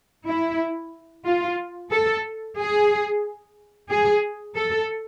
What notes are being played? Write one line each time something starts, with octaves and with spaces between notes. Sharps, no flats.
E4
F4
A4
G#4
G#4
A4